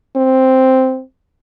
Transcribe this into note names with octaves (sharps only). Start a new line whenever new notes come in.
C4